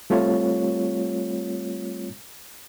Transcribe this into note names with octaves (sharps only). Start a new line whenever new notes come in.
G3 A3 C4 F4 C#5